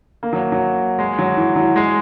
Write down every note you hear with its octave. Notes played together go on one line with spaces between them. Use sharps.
A#3
F#3
F#3
G#3
F#3
E3
F#3
G#3